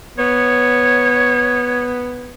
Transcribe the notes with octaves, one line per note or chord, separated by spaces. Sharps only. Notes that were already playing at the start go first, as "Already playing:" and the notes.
B3 C#5